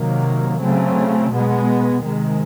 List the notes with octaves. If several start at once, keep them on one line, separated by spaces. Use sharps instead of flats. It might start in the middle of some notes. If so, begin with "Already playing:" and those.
Already playing: C3 D#3 F#3 A#3
C#3 F#3 A3 C4
B2 G#3 B3
C3 D#3 G#3